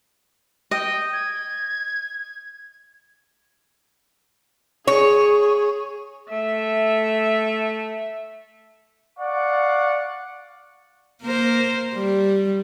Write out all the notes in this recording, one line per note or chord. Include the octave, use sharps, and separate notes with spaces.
D#5 G5
G#6
G#4 C#5
A3 E5
D5 F5 F#5 C#6
A#3 A#4 C5
G3